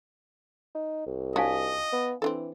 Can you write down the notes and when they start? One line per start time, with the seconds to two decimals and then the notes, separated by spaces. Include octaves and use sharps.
0.75 D#4
1.07 C2
1.36 D4 D#4 F#4 C#5 D#5 F5 G#5
1.92 B3
2.22 E3 C4 D4 A4